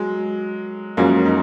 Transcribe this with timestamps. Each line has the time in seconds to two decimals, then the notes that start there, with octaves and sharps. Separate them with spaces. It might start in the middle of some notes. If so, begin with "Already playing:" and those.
Already playing: F#3 G#3
0.97 F#2 F3 G#3 A#3 C#4 F#4
1.25 D#4